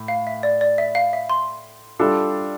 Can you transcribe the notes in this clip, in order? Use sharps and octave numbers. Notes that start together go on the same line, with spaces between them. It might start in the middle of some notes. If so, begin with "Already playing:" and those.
Already playing: A2
F5
E5
D5
D5
E5
F5
E5
C6
G3 D4 F4 A4